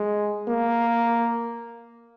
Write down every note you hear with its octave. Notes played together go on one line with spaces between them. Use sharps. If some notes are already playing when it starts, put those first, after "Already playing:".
Already playing: G#3
A#3